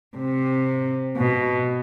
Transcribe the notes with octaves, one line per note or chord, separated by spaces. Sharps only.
C3
B2